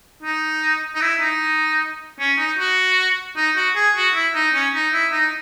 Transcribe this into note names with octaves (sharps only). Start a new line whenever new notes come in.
D#4
D#4
E4
D#4
C#4
D#4
F#4
D#4
F#4
G#4
F#4
E4
D#4
C#4
D#4
E4
D#4